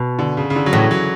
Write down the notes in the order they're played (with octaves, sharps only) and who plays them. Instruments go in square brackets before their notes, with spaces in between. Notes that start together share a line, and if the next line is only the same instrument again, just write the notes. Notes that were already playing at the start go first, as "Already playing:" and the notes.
Already playing: [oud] B2
[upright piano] D3
C#3
C#3
D3
F#3
[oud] A2 [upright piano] E3
[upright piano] F#3